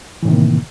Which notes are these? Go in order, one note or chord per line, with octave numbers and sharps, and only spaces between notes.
A2 C3 D#3 E3 A#3